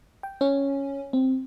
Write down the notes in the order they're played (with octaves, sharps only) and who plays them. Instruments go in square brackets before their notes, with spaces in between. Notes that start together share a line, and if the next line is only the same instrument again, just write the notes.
[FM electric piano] G5
C#4
C4